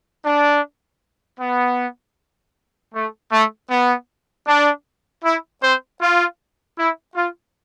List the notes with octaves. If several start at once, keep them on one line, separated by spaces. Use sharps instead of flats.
D4
B3
A3
A3
B3
D4
E4
C4 C5
F4
E4
F4